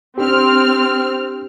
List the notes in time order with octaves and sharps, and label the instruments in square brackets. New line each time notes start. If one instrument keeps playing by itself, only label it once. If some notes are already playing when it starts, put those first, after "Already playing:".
[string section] C4 F6 [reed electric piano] D4 G4